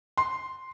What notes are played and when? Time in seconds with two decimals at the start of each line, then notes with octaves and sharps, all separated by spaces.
0.17 C6